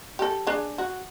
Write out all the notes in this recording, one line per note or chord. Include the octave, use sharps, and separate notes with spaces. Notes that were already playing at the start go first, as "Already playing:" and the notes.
G4 A4
D4 G#4
F#4